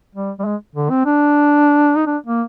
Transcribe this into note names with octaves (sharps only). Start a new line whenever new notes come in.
G3
G3
G#3
D3
C4
D4
D#4
D4
A#3